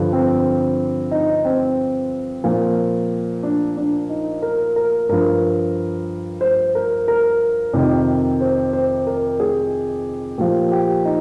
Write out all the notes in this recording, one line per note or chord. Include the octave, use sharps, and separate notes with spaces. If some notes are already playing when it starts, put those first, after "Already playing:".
Already playing: G2 D3 F3
C4
D#4
C4
A#2 F3
D4
D4
D#4
A#4
A#4
G2 F3 A#4
C5
A#4
A#4
F2 C3 D#3
C5
C5
A#4
G#4
A#2 F3 G4
G4
D#4